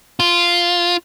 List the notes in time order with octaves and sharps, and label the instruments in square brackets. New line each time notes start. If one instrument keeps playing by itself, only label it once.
[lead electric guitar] F4